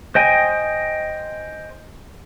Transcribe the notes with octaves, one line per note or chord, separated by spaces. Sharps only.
C5 D#5 G5 G#5